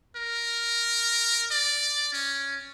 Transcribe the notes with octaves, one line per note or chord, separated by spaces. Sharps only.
A#4
D5
C#4